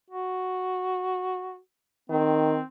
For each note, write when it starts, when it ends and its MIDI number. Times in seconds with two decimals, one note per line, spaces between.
0.10 1.58 66
2.10 2.58 51
2.10 2.63 60